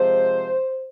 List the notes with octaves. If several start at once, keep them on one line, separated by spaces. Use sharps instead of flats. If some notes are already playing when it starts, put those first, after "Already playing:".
Already playing: C3 F3 G#3 C5